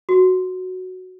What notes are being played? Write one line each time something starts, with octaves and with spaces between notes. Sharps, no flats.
F#4